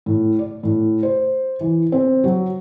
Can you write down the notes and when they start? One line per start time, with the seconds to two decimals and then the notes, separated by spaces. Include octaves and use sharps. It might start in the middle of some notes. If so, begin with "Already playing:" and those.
0.06 A2
0.39 D5
0.63 A2
1.03 C5
1.61 E3
1.92 C4
2.24 F#3